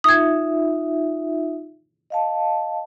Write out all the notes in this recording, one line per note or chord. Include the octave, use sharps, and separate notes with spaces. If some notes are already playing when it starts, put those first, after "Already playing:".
D#4 F4 E5 D#6 G#6
D#5 F5 A5